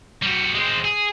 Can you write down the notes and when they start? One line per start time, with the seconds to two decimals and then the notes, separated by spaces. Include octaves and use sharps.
0.22 G3 F#4
0.54 G#3 C4
0.84 G#4